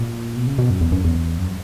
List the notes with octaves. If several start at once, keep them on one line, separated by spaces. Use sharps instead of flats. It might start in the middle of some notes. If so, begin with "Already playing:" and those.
Already playing: A#2
B2
C#3
B2
F#2
E2
F#2
E2
F#2